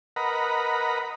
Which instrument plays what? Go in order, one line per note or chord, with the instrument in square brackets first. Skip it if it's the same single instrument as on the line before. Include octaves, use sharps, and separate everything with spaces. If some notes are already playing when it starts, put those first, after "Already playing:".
[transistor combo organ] A#4 B4 D#5 F#5 A#5 B5